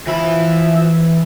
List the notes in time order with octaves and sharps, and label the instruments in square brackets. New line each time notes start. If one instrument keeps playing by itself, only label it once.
[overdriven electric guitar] E3 B5 [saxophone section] F3 E5